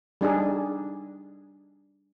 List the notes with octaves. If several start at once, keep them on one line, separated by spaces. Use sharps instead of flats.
G3 D4 D#4 G#4